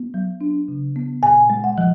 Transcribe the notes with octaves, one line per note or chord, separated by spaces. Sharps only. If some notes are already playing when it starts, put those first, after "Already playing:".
Already playing: B3
F#3
D4
C#3
B3
A#2 G#5
G#3
F#5
F3